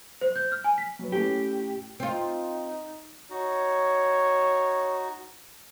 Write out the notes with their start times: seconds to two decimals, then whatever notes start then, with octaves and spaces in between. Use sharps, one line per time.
0.21 C5
0.36 G6
0.52 F6
0.64 G#5
0.78 B6
0.99 F#3 B4
1.12 A2 A3 C#4 G4
2.00 C4 D#4 F4
3.30 D#4 F#4 C#5